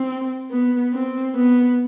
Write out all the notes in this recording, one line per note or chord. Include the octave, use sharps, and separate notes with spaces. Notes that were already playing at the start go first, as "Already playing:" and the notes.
Already playing: C4
B3
C4
B3